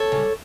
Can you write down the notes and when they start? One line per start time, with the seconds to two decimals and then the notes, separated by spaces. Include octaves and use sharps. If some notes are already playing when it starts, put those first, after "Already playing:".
Already playing: A4 C#5
0.12 C#3 G3